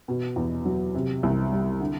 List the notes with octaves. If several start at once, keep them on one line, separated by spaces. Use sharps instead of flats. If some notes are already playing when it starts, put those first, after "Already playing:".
B2
E2
F#3
C3
C2
G3
D3